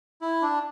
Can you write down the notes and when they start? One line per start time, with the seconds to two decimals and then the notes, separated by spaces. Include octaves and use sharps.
0.21 E4
0.42 D4